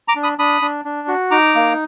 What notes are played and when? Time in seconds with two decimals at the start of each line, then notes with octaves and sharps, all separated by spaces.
0.08 A#5 D6
0.15 D4
0.23 B5 D#6
0.38 D4 B5 D#6
0.62 D4
0.85 D4
1.08 F#4
1.31 D#4 A#5 D6
1.55 A#3